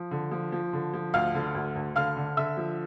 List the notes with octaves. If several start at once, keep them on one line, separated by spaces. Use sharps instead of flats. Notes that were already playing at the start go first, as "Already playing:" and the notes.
Already playing: F3
D3
F3
F3
D3
F3
D2 F5 F6
D3
D2
D2
D3 F5 F6
D3
D3 E5 E6
F3